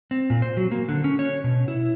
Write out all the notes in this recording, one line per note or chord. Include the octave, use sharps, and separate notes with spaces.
C4
A#2
C5
F#3
A#3
D3
C#4
C#5
B2
E4